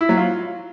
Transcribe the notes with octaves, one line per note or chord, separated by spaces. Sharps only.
E4
F#3
F4